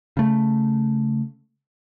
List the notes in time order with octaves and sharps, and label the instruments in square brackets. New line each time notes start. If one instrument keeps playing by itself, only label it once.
[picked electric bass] C#3 A3